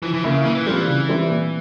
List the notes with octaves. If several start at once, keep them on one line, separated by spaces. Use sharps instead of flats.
E3 F3
E3
C#3 A#3 E4
A#2 E3
E3
F3 G3 C4 F4
E3
C#3
G3 C4 E4
A#2